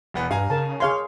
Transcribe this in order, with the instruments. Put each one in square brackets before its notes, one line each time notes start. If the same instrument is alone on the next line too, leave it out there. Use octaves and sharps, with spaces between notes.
[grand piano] E1 E2 B3
[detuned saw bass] G2 [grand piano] F5 G#5 A#5
[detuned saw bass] C#3 [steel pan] A#4 A5
[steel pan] G#4 F5 C6 [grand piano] C#5 C#6